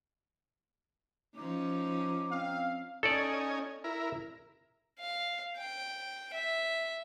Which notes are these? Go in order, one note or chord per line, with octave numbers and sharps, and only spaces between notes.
F3 C#4 D#4 D6
C4 F5
C#4 D#4 A4 D5 G#5
E4 A#4
F5
G5
E5